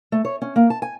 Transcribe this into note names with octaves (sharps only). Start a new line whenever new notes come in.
A3
C#5
C#4
A#3
A5
G#5